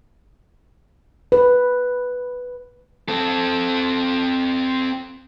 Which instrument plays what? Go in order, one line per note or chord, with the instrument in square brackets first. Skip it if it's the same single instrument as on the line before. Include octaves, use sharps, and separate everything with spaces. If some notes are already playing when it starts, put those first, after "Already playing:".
[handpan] B4
[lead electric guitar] C4 A4